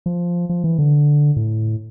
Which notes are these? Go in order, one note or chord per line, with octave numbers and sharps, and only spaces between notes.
F3
F3
E3
D3
A2